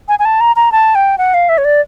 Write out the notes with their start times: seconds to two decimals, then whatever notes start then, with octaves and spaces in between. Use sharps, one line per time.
0.08 G#5
0.19 G#5
0.25 A5
0.41 A#5
0.56 A#5
0.72 A5
0.95 G5
1.18 F#5
1.34 F5
1.49 E5
1.58 C#5
1.65 D5